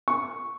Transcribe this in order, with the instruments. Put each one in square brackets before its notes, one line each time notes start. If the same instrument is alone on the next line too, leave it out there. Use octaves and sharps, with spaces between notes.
[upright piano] C#6